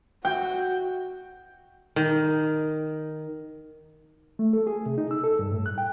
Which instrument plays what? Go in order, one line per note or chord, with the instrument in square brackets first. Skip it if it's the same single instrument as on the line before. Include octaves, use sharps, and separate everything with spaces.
[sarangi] F#4 [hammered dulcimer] G5
[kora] D#3
[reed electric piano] A3
A4
G#4
C3
D#4
E6
A4
G2
A2
F#6
G5